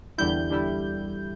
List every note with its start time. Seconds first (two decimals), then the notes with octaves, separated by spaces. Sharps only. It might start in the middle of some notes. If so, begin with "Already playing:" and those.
0.18 E2 D3 G3 E4 G6
0.50 E2 D3 G3 E4